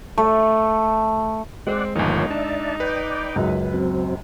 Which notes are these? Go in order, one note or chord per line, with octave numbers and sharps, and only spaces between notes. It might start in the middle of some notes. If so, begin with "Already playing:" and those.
A3
G#3 C4 D5 F#5
G1 D#2 F3 A#3 D#4 C#5
D4 D5 E5 A5
B4 D5 G5
C#2 F#2
F#3 C4